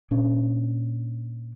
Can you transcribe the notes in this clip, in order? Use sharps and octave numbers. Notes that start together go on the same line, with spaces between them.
A#2 C#4 D4